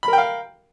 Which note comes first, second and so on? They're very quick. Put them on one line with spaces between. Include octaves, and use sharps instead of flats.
B5 A#4 G5 F5